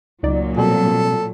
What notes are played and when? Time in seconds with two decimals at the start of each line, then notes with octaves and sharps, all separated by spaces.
0.23 C#2 A#2 F#3 D#4 D5
0.57 B2 G3 C4 A4